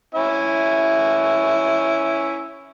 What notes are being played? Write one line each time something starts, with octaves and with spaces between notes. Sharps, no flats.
C#4 E4 E5